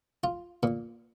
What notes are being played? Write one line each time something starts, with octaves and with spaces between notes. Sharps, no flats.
F4
A#2